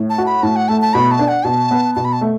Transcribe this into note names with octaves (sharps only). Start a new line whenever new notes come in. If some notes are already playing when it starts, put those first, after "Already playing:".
Already playing: A2
A5
F#4
B5
A2 A5
F#5
A3 A5
A5
B2 B5
A5
D4
F#5
B2 A5
B3
B2 A5
B5
A5
A3